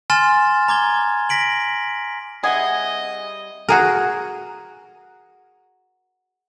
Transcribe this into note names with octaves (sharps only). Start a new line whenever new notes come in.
G#5 C6 F6 A6 E7
A#5 D6 G#6 G7
A#6 B6 D7 F#7
G3 C4 G#4 D#5 E5 F#5
F#4 G#4 A#4